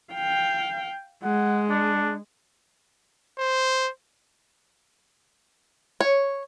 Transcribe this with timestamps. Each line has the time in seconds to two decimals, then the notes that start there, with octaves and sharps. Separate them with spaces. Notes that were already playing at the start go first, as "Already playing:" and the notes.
0.14 F5 G5
1.24 G#3 F#5
1.70 D4
3.39 C5
6.01 C#5